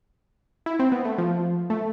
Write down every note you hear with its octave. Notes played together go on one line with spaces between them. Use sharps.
E4
C4
B3
A3
F3
A3